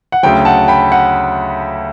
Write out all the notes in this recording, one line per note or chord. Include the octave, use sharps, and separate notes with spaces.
F#5
D2 C#3 F#3 G5
F#5 A5
G5 B5
F#5